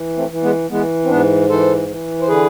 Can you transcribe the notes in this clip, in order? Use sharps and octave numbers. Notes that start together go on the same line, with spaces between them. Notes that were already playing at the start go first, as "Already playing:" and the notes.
Already playing: E3
A3 C4
E3
G#3 B3
E3 G#3 B3
C4
G#2 B3 D4
E3 A4 C5
E3
C5
D3 G#4 B4